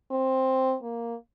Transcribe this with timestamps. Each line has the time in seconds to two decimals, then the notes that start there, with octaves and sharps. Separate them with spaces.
0.11 C4
0.83 A#3